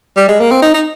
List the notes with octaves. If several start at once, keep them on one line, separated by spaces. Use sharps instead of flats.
G3
G#3
A#3
C4
D#4
D#4